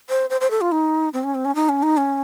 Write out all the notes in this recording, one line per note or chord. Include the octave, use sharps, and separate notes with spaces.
C5
C5
C5
A4
F4
D#4
C4
C#4
C4
C#4
D#4
C#4
D#4
C#4